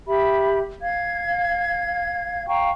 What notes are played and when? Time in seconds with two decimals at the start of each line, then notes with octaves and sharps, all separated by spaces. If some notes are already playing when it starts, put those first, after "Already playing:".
0.08 G4 E5 B5
0.82 F5 G#6
2.49 F5 G5 A#5 C#6